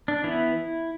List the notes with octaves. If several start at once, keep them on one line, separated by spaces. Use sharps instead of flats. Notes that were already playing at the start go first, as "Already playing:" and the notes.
D4
E3 B3 E4